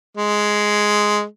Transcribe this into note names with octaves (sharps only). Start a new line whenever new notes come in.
G#3